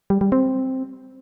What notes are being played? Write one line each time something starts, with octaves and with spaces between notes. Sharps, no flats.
G3
G3
C4